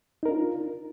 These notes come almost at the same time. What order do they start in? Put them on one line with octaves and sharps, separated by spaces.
D#4 A#4 D4 F4